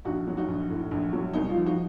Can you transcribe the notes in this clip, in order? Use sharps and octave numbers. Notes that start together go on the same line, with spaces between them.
A#1 D#4 F#4
F#3
D#4 F#4
A#1
A2
A#1
F#3
C2 D#4
F4
F3
D#4 F#4